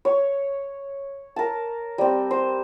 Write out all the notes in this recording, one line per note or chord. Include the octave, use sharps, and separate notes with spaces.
C#5
A#4 A5
G3 C4
C5